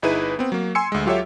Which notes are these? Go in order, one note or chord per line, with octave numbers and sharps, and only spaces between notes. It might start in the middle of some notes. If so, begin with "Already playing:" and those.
G1 D#4 E4 G#4 B4 D#7
B3 C4
F#3 A#3
G#5 C6 E6 C#7
D2 G#3
F#3 F4 G4 A4 C#5 E5